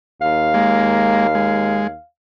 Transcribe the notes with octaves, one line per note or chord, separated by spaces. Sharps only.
D#2 F5
G#3 A#3
G#3